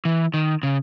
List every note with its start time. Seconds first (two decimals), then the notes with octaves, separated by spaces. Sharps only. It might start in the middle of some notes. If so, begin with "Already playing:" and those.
0.05 E3
0.34 D#3
0.63 C#3